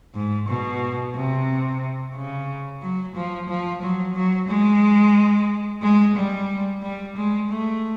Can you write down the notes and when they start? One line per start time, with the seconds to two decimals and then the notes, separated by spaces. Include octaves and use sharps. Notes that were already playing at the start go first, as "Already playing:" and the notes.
0.15 G#2
0.48 B2
1.15 C3
2.15 C#3
2.82 F#3
3.15 F3
3.49 F3
3.82 F#3
4.15 F#3
4.49 G#3
5.82 G#3
6.16 G3
6.82 G3
7.16 G#3
7.49 A3